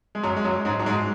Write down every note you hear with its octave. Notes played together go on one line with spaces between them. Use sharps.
G#3
F#2 F#3
G#3
F#2 F#3
G#2 G#3
F#3
G#2 G#3